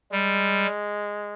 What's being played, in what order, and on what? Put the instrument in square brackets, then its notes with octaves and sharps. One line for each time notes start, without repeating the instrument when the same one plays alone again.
[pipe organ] G3 [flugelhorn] G#3